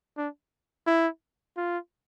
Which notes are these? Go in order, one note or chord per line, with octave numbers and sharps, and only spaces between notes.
D4
E4
F4